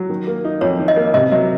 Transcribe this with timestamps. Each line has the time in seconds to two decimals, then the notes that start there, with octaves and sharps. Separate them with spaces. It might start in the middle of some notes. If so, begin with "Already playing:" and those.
Already playing: F#3
0.10 D#3
0.27 A#3
0.45 D#4
0.61 F2 C#5
0.79 D#3
0.88 D#5
0.96 A#3
1.14 C3 D#5
1.31 F#3 D#5